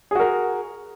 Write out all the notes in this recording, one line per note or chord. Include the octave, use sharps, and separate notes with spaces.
F#4 G#4 A#4